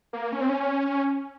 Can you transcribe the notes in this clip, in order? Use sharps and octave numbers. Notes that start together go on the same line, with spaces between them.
A#3
C#4
C4
C#4